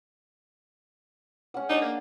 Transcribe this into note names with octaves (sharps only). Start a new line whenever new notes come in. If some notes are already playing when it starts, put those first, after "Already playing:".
C#4 F#5
D4 D#4
A#3